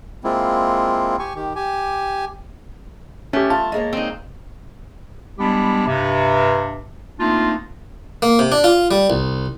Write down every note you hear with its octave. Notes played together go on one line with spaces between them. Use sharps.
G#3 A#3 C4 E4 F4
G4 G#5 C#6
D#3 G4
G4 G#5
A3 C#4 G4
F4 A5
G#3 A#3 C#5
C4 D#4
G3 G#3 B3 D4 E4 G4
G2 C3
A3 A#3 C4 D4 D#4 F4
A#3
C3
D4
F4
G3
C2